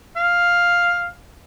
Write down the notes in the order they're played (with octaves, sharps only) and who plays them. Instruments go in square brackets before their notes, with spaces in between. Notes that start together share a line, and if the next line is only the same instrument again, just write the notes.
[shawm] F5